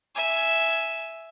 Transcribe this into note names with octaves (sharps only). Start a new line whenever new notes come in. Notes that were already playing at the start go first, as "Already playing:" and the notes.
E5 G#5